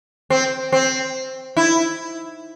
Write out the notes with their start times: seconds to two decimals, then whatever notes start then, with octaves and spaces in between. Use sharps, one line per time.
0.30 C4
0.72 C4
1.57 E4